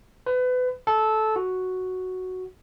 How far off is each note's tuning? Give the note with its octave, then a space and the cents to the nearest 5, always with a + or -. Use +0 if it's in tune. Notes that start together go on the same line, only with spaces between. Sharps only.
B4 +30
A4 -15
F#4 +0